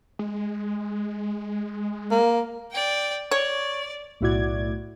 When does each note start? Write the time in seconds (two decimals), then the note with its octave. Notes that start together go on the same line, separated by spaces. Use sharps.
0.19 G#3
2.11 A#3
2.72 D5 G5
3.31 C#5 D5
4.21 B1 A2 E4 F#4 D5 G#6